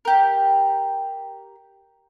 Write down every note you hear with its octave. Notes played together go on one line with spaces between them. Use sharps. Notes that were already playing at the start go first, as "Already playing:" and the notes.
G4 A#4